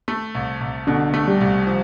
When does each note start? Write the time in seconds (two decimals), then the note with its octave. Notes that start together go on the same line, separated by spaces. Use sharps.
0.08 A3
0.35 C2
0.61 C2
0.87 B2 D3
1.14 A3
1.27 G3
1.41 C2
1.67 F3